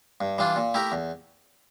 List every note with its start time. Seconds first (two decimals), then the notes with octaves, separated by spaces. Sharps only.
0.21 G2
0.38 E3 G3 D4 F4
0.56 A#2
0.74 A3 E4 G4 A#4
0.92 E2